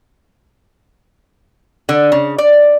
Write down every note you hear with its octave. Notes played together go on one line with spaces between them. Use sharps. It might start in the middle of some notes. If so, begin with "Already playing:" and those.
D3
C#3
D5